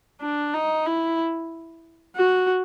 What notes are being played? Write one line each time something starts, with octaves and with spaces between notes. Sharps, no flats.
D4
D#4
E4
F#4